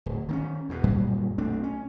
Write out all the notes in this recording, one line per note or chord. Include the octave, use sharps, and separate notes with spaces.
D1
D#3 C4 C#4
E2 B2
D#1 F#2 A#2 G3
B1 A3 C4 D4
C#4